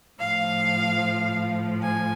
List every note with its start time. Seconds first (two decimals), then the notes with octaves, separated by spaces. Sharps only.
0.19 A2 F3 F5
1.82 G#5